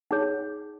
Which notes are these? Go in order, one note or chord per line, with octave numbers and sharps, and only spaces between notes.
D#4 G#4 C#5 F#5